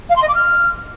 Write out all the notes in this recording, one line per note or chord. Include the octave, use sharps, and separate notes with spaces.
F5
C6
D#5
D6
F6